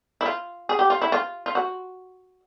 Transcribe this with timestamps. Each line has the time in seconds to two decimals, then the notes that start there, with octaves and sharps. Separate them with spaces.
0.21 E4
0.26 F4
0.69 G#4
0.79 G4
0.90 F4
1.02 E4
1.12 F4
1.46 F4
1.55 F#4